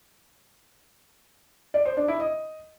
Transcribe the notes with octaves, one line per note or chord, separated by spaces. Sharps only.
D5
C5
D4
E4
D#5